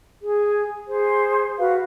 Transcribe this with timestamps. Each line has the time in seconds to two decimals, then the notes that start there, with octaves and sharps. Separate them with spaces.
0.22 G#4
0.87 G#4 C5
1.58 F#4 B4 F5